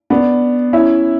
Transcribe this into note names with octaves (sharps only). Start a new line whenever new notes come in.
B3 D4
C#4 E4